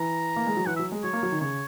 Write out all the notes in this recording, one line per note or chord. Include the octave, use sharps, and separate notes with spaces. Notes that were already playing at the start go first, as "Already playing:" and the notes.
Already playing: E3 A#5
A#3
G#3
F#3
E3 F#5
F#3 E5
G#3
F#3 C#5
A#3
F#3
D#3
C#3 C#5